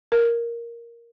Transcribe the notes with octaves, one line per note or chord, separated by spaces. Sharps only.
A#4